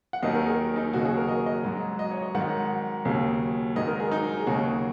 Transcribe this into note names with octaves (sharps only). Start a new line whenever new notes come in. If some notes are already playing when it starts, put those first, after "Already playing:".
F#5
D#2 D#3 F#3 D#5
A#4
G#4
D#4
D#2 C#3 F#3 F#4
G#4
A#4
D#5
D#5
G#2 F#3
D#5
C#5
D#5
G#2 D#3 F#3 F#5
D#2 C#3 F#3
G#2 D#3 F#3 D#5
A#4
G#4
D#4
G#4
D#2 C#3 F#3 F#4